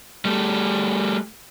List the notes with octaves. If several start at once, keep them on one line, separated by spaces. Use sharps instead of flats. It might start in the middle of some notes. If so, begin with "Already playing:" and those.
G3 A3